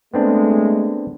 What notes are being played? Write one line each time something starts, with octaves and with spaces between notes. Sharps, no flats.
G#3 A3 B3 C4 D4